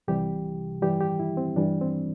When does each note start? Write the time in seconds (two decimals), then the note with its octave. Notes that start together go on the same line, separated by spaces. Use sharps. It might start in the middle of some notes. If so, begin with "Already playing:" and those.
0.08 C2 C3 E3 G3 G4
0.82 G2 E3 G3 G4
1.01 G4
1.19 E4
1.37 C4
1.56 G2 E3 G3 D4
1.81 C4